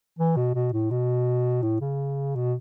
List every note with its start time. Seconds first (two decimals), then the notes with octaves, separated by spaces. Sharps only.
0.19 E3
0.36 B2
0.55 B2
0.73 A2
0.91 B2
1.62 A2
1.81 C#3
2.36 B2